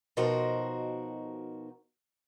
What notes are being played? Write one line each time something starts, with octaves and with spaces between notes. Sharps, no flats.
B2 F3 D#4 F#4 A#4 C5